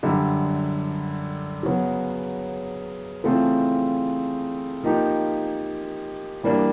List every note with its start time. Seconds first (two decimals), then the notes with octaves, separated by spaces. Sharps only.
0.03 F#2 D3 G3
1.63 C#3 F#3 B3
3.24 C#3 E3 A3 C4 F4
4.83 F3 A#3 D#4 G4
6.43 E3 G3 A#3 D4